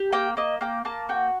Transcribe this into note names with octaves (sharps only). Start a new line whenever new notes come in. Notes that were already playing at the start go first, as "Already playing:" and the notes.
Already playing: G4
A#3 G5
A#3 D#5
A#3 G5
A#3 A5
F#4 G5